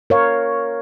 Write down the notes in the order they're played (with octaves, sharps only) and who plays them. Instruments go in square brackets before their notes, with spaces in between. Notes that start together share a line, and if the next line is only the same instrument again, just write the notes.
[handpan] A#4 C#5 F5